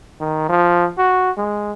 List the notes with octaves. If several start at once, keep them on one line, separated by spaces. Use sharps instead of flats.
D#3
F3
F#4
G#3